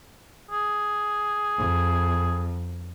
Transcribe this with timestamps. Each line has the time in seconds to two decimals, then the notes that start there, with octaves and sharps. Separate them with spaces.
0.51 G#4
1.57 F2